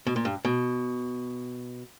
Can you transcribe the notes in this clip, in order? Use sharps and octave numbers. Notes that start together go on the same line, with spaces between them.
B2
A#2
G2
B2